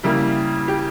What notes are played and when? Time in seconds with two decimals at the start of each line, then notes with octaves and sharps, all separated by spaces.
0.03 C#3 G3 A#3 E4
0.68 G4